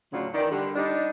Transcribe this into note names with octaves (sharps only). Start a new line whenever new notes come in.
D2 A2 C#3 F#3 D4 F4
D#3 E3 D5
D3 G3
G3 D4 D#4